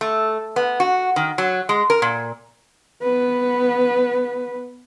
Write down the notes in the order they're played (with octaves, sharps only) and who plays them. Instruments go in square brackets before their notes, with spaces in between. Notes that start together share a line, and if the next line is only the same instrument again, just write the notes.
[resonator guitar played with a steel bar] A3
B3
F#4
D#3
F#3
G#3
A#4
A#2
[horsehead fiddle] B3 B4